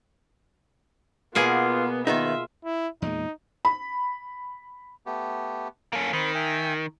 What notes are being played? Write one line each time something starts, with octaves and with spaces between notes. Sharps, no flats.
B2 A#3 B3 F4 G#4
D#3 B3 D#4 F4 E5
E4
E2 A#2 G#3 D#4
B5
A3 B3 G4
A#3 C#4 A4 F5
D#3 C4 B5
E5 G5 G#5